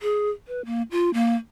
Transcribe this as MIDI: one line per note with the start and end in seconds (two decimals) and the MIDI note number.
0.01 0.30 68
0.48 0.64 71
0.65 0.82 58
0.91 1.12 65
1.14 1.35 58